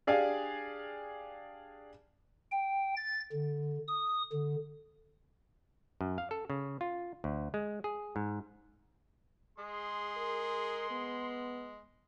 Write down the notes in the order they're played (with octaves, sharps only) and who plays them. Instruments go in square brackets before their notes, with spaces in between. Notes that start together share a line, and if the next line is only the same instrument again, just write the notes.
[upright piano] D4 G4 G#4 D5 F5 G#5
[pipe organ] G5
A6
D3
D#6
D3
[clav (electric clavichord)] F#2
F5
A4
C#3
F4
D2
G#3
G#4
G#2
[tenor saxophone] G#3 [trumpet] G#4 [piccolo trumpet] C6
[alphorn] A#4
B3